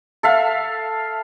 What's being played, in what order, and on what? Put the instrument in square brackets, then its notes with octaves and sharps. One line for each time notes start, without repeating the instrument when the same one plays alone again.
[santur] A4 E5 F5